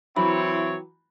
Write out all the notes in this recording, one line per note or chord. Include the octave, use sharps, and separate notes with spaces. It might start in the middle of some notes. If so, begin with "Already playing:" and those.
E3 F#3 C4 E4 C#5 B5